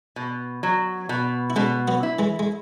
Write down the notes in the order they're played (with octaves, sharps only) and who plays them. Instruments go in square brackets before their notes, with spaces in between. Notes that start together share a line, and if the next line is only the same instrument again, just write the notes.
[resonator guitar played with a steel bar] B2
F#3
B2
[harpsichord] E4
[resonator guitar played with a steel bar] B2 [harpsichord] G#3 C#4
[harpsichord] F#3 B3
[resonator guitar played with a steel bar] E4
[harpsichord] E3 G#3
G#3